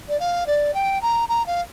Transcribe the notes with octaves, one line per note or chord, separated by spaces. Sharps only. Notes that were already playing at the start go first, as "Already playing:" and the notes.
D5
F5
D5
G5
A#5
A#5
F5